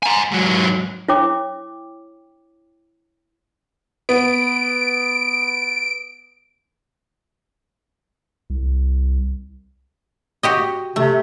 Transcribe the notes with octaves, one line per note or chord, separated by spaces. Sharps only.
G#5 A#5
G#2 F#3
E4 C#5 G5 D6
B3 D7
C2
F#4 G4 D#5
C3 A3